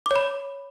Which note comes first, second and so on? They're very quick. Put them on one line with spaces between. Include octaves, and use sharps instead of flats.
D6 C#5 B5